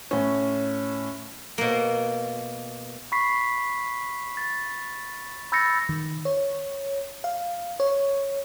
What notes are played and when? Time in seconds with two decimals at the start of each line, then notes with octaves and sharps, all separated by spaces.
0.11 A2 C#4
1.58 B2 A#3
3.12 B5 C#6 B6 C7
4.37 A6
5.52 B5 E6 G6 A6 A#6 C#7
5.89 D#3
6.25 C#5
7.24 F5
7.80 C#5